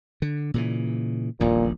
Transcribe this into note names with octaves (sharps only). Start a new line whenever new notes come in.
D3
A#2 C#3 E3
D#1 A#1 E2 A#2